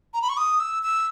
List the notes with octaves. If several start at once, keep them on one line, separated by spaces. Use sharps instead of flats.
A#5
B5
C#6
D#6
E6
E6